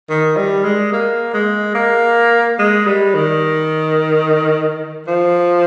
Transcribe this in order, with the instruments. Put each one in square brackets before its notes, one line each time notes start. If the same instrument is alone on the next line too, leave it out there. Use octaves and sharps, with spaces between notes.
[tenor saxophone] D#3
G3
G#3
A#3
G#3
A#3
G#3
G3
D#3
F3